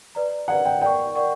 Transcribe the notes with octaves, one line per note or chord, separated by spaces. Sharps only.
B4 D5 A#5
B4 D5 F#5 A#5
G5
A#4 D5 F#5 G5 C#6
A#4 D5 F#5 C#6